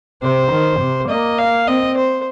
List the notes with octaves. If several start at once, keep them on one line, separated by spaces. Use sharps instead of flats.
C3 C5
D#3
C3
A#3 D#5
F5
C4 D#5
C5